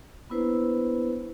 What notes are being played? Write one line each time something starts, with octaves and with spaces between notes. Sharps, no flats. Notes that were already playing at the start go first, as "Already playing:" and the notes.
A#3 B3 D4 E4 B4 C5